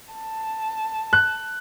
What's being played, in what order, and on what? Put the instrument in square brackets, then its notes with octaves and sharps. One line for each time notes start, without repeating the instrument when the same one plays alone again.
[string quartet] A5
[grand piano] F#6